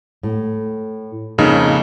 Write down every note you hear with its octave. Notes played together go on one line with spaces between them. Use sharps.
A2
F2 C#3 A#3 D#4